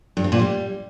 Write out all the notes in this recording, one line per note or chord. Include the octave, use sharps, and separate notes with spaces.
G2
C4
A#2
G3